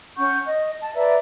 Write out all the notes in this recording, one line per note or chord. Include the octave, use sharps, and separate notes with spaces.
C#4 F#5 C#6 G6
D#5
A5
B4 D5 E5 A#5